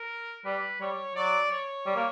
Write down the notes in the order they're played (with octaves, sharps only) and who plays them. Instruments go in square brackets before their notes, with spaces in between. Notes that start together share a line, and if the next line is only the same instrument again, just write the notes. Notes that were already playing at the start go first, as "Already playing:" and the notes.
Already playing: [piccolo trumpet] A#4
[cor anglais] G3 [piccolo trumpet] B4
[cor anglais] G3 [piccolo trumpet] C#5
[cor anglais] F#3 [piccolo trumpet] D5
[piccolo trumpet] C#5
[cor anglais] G3
A#3